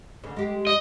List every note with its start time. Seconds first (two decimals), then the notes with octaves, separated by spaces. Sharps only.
0.24 D2 C#3
0.36 G#3 G4
0.67 D#5